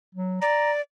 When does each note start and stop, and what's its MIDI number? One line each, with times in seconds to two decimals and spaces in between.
0.15 0.40 54
0.42 0.81 74
0.42 0.72 82